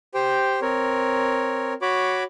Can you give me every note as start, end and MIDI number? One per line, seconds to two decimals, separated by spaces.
0.14 0.60 67
0.14 0.60 72
0.14 0.60 79
0.62 1.73 60
0.62 1.73 70
0.62 1.73 73
1.82 2.23 66
1.82 2.23 73
1.82 2.23 83
1.82 2.23 86